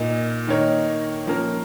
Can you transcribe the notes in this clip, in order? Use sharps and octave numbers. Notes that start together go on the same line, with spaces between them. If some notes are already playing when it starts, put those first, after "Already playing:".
Already playing: A#2 A#3 D#4
D#3 A#3 D#4 A#4 C#5
F3 A#3 C#4 A#4